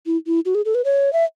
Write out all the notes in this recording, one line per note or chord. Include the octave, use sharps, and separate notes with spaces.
E4
E4
F#4
G#4
A4
B4
C#5
E5